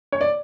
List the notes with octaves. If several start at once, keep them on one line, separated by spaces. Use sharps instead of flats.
C#5
D5